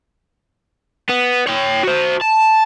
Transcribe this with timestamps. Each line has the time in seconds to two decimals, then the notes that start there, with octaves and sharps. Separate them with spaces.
1.10 B3
1.47 C#5 G5
1.83 F#4 C5
2.21 A5